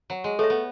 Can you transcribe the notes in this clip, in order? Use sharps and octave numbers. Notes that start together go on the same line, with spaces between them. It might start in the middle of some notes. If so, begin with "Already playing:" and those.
F#3
G#3
A3 A4 C#5 E5
B3